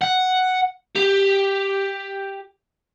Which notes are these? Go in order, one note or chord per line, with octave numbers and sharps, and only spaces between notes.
F#5
G4